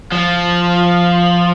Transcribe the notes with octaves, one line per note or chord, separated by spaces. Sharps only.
F3